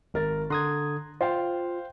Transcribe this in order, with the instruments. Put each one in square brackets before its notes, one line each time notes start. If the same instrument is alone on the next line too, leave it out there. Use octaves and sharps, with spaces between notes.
[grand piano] G#1 A#4 A6
[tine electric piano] D3 D#6 G#6 [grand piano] A#5 C6 F#6
[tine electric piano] F4 [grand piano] C5 F5 G5